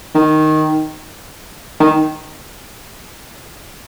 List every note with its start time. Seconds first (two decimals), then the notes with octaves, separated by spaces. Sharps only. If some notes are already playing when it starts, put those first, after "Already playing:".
0.15 D#3
1.80 D#3